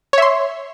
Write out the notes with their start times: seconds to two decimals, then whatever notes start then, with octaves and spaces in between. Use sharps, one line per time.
0.13 C#5
0.18 E5
0.22 C6